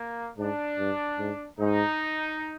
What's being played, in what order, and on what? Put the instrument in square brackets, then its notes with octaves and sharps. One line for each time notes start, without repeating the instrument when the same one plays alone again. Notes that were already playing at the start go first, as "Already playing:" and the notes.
Already playing: [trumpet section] A#3
[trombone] G#2 [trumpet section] D4
[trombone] G2
G#2
[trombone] G#2 [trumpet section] D#4